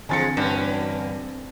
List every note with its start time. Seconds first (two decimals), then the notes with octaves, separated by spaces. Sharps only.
0.09 D3 E3 F3 G#3 C4 G#5 A6 C#7
0.37 G2 B2 A#3 C#4